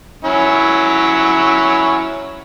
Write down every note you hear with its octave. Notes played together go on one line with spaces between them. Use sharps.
F#3 C#4 E4